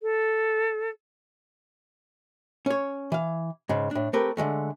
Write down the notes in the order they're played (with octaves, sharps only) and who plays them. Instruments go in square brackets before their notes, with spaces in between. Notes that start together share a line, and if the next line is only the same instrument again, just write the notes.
[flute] A4
[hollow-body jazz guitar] C#4 C#5
E3 F5
G#2 C#3
A2 D4
A3 C4 G4 A#4 B4
D3 E3 G#3 A3